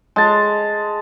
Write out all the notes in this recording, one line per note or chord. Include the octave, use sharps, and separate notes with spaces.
G#3 A5